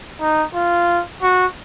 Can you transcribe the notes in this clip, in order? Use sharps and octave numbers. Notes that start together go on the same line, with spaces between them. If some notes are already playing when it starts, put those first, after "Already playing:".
D#4
F4
F#4